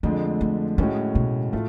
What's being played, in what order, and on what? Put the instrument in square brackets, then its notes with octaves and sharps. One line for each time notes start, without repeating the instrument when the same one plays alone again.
[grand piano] F2 D3 F3 G#3 [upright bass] A3
[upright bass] A3
[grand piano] A2 G#3 C#4 F#4 [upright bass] A3
[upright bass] B2
[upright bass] A2 [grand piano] A3 F4